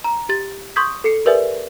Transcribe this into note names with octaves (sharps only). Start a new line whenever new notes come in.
A#5
G4 A6
C6 C#6 D#6 G6 G#6 B6
A4 C7 C#7
G4 A#4 B4 D5 E5 G#5